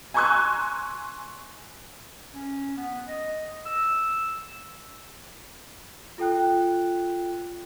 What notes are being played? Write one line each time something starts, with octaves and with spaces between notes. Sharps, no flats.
G#5 A#5 C6 C#6 E6 F#6
C#4
B3
D#5
E6
F4 A4 G5 F#6